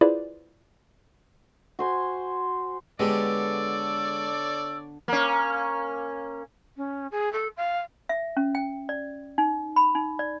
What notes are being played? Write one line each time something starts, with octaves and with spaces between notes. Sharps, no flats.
E4 F4 G#4 B4 C5 D5
F#4 C5 G#5
D3 G#3 B3 G4 A4 C#5 D5 E6
A#3 C#4
C#4
G#4
A4
F5
E5
C#4
G5
D5
D#4
B5
D#4
D5